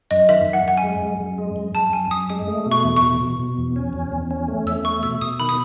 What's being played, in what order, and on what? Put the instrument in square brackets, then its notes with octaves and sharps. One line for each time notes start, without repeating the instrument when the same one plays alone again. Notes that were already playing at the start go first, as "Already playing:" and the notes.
[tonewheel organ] F#2 [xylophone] D#5
[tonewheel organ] D#3 [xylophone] E5
[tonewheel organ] F#2
[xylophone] F#5
[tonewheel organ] F#2 [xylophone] F#5
[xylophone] G#5
[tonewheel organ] G#3
F#2
F#2
G#3
F#2
[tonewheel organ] F#2 [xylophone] A5
[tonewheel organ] F#2 [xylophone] G#5
[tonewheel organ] F#2 [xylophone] D#6
[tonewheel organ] G#3 [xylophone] D#6
[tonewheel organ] A3
B2
[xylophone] C#6
[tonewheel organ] E2
[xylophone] C#6
[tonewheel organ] B2
B2
B2
E2
C#4
E2
E2
C#4
A3
[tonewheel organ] E2 [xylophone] E6
[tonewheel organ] A3 [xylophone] C#6
[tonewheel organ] B2 [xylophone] E6
[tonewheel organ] B2 [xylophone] D#6
[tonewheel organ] D#3 [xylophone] B5
[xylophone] D#6